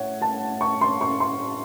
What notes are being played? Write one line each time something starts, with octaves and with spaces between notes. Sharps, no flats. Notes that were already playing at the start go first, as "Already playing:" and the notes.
Already playing: A2 C#5 F#5
A5
C#6
C6
C#6
C6